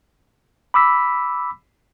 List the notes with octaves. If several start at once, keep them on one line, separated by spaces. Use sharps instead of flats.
B5 D6 E6 B6